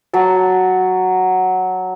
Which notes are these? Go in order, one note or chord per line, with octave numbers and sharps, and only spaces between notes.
F#3 A5